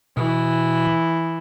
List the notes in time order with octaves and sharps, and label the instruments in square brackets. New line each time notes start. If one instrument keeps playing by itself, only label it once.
[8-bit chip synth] B2 [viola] E3